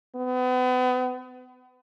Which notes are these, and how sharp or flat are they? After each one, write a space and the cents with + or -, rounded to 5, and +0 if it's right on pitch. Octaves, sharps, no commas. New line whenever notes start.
B3 +35